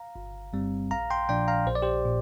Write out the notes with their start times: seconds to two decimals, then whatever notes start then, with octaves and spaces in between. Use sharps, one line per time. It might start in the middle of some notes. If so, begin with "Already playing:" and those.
Already playing: F5 A#5
0.16 G1
0.53 G2 G3 C4
0.91 A#1 F5 A#5
1.10 G5 C6
1.29 A#2 F3 D4 D5 G5
1.48 F5 A#5
1.67 A#1 C5
1.75 D5
1.82 G4 C5
2.05 A#2